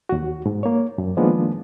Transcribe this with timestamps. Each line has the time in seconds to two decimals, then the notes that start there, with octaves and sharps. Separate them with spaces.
0.09 D#2 F#4
0.46 G#2
0.63 A#3 C#5
0.98 F#2
1.17 D#3 F3 G#3 A#3 B3 D4